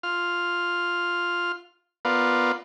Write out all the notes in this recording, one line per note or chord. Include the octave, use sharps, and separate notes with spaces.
F4 F6
B3 F4 A#4 B4 D5 F5